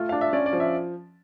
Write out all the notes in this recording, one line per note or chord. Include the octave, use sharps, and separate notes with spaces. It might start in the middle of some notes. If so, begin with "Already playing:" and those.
Already playing: A3 F4
D4 F5
E5
C#4 D5
D5
F3
E5